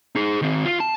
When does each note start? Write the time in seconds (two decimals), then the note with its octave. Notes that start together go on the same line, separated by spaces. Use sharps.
0.15 D#4 G#4
0.42 D#3 C4
0.65 F4 F5
0.80 A5